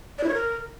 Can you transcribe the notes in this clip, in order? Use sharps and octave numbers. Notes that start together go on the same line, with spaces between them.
D5
E4
C#5
A#4